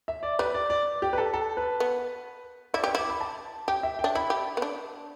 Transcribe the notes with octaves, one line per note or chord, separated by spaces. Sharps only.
E5
D5
G3 B4
D5
D5
G4
B4
A4
A4
B4
B3
E4 D5
G4 B4
E4 D6
B5
A5
G4 G5
E5
G5
D4
E4 B5
G4
B3
D4